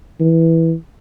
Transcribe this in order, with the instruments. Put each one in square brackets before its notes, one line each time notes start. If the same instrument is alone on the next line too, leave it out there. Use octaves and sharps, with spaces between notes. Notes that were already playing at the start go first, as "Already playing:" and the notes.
[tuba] E3